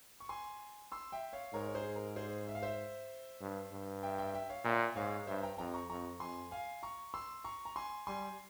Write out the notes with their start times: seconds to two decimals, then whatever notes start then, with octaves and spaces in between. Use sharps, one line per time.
0.20 C#6
0.29 G#5 C6
0.92 C6 E6
1.12 E5 G5
1.33 C#5 F5
1.53 G#2 A#4 C#5
1.67 C#5
1.74 G#4 C5
1.96 A#4
2.16 G#4 C5
2.48 E5
2.55 F5
2.62 C5 E5
3.41 G2
3.72 G2
4.03 E5 G5
4.18 E5 G5
4.34 E5 G5
4.49 C#5 F5
4.64 A#2 E5 G5
4.96 G#2 C#5 F5
5.27 G2 C5 E5
5.43 G5 A#5
5.58 F2 G5 A#5
5.74 A#5 C#6
5.89 F2 A#5 C#6
6.20 F2 G#5 C6
6.51 F5 G#5
6.83 A#5 C#6
7.14 C6 E6
7.44 A#5 C#6
7.65 A#5
7.76 G#5 C6
8.07 G3 G#5 C6